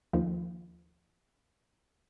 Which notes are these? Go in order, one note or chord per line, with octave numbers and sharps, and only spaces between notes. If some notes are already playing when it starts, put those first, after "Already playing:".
D#2 F3